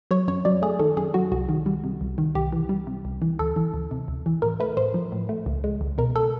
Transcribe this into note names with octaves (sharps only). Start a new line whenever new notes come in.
F#3 C#5
F#2 C#5
F#3 D5
A3 G#4
D#3 A4
F#2 G#4
F#3 F#4
C2 F#4
D#3
G3
C3
C2
D#3
C2 G4
E3
G3
C3
C2
E3
D2 A4
E3
D2
C3
D2
E3
A2 A#4
A3 B4
A2 C5
F3
A2
A3
C#2
G#3
C#2
B2 A#4
A4